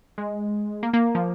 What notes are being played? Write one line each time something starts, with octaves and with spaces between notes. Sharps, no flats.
G#3
A#3
A#3
F3